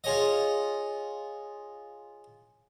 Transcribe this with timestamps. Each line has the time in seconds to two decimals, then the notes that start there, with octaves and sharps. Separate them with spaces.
0.04 F4 G#4 C#5 D#5